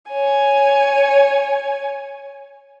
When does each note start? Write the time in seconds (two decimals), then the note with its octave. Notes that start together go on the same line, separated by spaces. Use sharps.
0.11 C#5 G#5